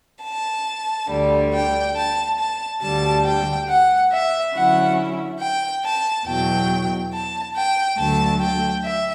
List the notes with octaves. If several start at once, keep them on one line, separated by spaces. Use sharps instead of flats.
A5
D2 D3 G3
G5
A5
A5
D2 D3 G3 A5
G5
F#5
E5
D3 F#3 C#4 E4 F#5
G5
A5
E2 B2 F#3 G5
A5
G5
D2 D3 F#3 A3 A5
G5
E5